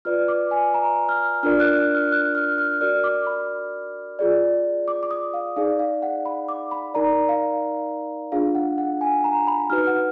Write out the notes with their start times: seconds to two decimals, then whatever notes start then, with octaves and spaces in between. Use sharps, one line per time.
0.05 F4 B4 D5 F6
0.28 D6
0.51 G#5
0.74 A#5
1.09 F6
1.43 D4 F4 A#4 D5 F6
1.60 F#6
1.78 F#6
1.95 F6
2.12 F#6
2.35 F6
2.58 F6
2.81 F#4 A#4 D5 F6
3.04 D6
3.27 B5
4.19 F4 G#4 D5
4.88 D6
5.03 D6
5.11 D#6
5.34 F5
5.56 D#4 G#4 D5 F5
5.79 F5
6.02 F#5
6.26 B5
6.48 D6
6.71 B5
6.94 D#4 A#4 D5 A#5
7.29 F5
8.32 D4 F4 G#4 F5
8.55 F#5
8.78 F#5
9.01 G#5
9.24 A#5
9.47 B5
9.70 D#4 F#4 B4 F6
9.87 F#5